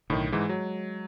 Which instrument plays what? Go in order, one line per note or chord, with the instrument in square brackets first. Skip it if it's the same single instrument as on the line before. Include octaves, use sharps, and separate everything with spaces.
[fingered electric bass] B1 D3 [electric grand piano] A2 D#3
[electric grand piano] G#2 E3 [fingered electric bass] G#3
[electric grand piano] F#3